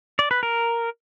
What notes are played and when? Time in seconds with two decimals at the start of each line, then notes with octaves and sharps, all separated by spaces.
0.19 D5
0.31 B4
0.43 A#4